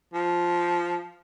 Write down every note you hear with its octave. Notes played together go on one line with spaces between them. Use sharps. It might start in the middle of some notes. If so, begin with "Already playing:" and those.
F3